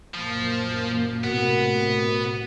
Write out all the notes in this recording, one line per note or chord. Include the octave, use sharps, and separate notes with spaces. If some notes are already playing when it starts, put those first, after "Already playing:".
F#2 A#2 F3 A#3
A2 C3 B3 F#4 A#4 F#5